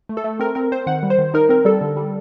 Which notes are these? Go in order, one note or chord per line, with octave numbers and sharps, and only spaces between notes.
A3
A4
A3
C4 A#4
C4 A#4
C4 C5
D#3 F#5
G3
C5
D#3
D#4 A#4
C4 A#4
G3 A4
D3
G3